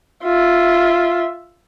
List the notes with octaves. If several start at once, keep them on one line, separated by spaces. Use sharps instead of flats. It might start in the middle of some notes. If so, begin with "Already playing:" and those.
F4 E5